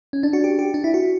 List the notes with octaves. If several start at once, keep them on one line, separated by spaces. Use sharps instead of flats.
C#4
D4
F#4
G4
G4
D4
E4
F#4